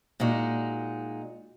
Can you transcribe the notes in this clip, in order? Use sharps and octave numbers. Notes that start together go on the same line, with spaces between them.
A#2 G#3 D#4 F#4